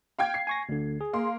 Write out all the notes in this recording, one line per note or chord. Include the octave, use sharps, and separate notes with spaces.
F5 G5 G#6
C7
G#5 C#6 A#6
D2 D3
G#4
A#3 C6